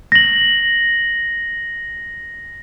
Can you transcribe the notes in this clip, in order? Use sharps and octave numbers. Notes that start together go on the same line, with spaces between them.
A#6 F#7